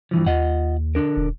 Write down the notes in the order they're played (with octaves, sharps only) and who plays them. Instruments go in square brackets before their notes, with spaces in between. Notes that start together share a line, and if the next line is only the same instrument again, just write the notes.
[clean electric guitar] G2 E3 F3
[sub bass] D#2 [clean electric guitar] F4 D#5 F#5
[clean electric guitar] D3 D4 A#4
[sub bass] D#1